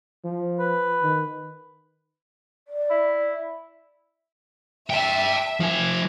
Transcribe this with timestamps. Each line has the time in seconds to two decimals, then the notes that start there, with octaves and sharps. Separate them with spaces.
0.25 F3
0.60 B4
1.02 D#3
2.68 D5
2.90 E4
4.90 E5 G5 A5
5.60 F3 G#5